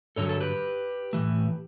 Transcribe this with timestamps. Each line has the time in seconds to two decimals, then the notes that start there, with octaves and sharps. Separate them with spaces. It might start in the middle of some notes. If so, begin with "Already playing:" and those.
0.16 G2 D3 F#3 A4 C#5
0.29 A4
0.41 G4 B4
1.13 A2 E3 A3